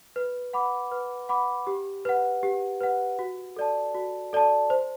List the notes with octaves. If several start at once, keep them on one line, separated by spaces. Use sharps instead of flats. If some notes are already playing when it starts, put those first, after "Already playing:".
B4
F#5 B5 D6
B4
F#5 B5 D6
G4
B4 F#5
G4
B4 F#5
F#4
A4 D5 A5
F#4
A4 D5 A5
C5